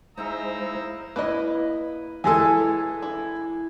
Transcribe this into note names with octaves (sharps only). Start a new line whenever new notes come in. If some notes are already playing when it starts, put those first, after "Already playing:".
G#3 D#4 E4 G#4 C5 F5 A#5 E6
A#3 E4 B4 D#5
E3 G#3 A4 G#5
E4